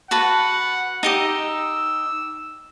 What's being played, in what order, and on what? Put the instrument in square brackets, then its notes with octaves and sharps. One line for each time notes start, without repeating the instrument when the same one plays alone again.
[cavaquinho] F#4 B4 A5 [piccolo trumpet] F#5
[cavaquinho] D#4 G4 D#5 [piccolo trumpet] E6